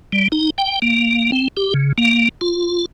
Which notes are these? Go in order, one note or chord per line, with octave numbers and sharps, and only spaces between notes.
G3
D#4
G5
A#3
C4
G4
C#3
A#3
F4